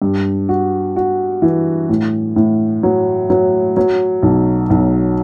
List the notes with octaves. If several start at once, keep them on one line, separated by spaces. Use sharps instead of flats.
G2
F#4
F#4
E3
A2
A2
F#3
F#3
F#3
B1
B1